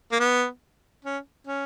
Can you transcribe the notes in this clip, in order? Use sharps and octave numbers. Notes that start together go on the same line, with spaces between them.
A#3
B3
C#4
C#4